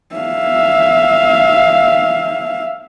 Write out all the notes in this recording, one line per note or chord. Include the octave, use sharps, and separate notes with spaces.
E5 F5